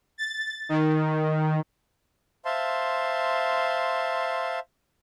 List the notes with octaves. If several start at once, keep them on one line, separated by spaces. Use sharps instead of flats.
A6
D#3
C5 E5 F5 A5 C6